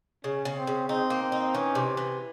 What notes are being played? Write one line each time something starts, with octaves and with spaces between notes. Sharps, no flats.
C#3 C#4
C#3
C4
C#3
C4 D#4
A#3
C4
D#4
E3 C#4
C3
E3